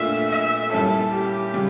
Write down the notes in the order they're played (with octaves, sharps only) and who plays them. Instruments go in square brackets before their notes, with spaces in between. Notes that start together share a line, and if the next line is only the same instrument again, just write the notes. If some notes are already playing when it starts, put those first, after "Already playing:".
Already playing: [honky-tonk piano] A#2 A3 D4 F4 [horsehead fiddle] E5
[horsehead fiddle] E5
[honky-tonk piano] A#2 G3 C#4 E4 [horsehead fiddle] A4
[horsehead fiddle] G4
[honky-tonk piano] C#3 G3